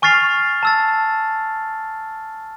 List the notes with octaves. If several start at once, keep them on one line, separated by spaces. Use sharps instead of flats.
G#5 C#6 F6 A6 C7 F7
A5 E6 A6